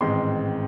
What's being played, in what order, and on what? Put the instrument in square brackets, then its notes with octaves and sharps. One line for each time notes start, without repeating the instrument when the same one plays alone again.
[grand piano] A1 G#2 D#3 G#3 C4 C6